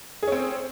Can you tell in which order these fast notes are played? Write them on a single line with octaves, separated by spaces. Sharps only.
G#4 C#4 C4